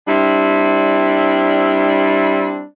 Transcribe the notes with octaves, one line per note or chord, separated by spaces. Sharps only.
G3 C4 D4 E4